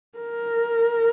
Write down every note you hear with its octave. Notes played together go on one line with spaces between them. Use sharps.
A#4